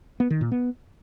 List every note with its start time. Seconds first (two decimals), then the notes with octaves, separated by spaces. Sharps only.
0.20 B3
0.30 D#3
0.41 A#2
0.52 B3